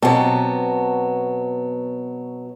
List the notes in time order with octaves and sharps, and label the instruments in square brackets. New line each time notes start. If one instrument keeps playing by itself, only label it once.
[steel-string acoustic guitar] B2 B3 [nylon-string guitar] F#3 C4 G4 [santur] A5